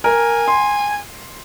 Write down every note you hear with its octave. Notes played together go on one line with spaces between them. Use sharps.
A#4 G#5
C6